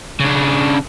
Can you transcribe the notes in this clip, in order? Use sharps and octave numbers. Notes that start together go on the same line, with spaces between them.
C#3 D4